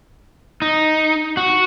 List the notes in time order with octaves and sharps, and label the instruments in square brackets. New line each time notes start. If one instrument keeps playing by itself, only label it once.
[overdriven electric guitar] D#4
F#4